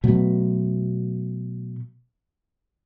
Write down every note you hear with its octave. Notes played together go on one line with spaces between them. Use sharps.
B2 F#3 A3 B3